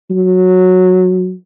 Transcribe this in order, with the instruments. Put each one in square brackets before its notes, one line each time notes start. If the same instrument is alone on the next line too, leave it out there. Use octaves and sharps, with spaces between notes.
[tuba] F#3